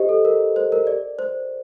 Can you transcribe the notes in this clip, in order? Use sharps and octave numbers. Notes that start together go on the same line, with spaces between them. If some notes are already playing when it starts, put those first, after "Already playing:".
Already playing: G4 C5 D#5
A4
A#4
C5
A#4
D5
C5